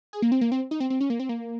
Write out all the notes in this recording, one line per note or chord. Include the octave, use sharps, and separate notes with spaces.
G#4
A#3
C4
A#3
C4
D#4
C4
C4
C#4
A#3
C4
A#3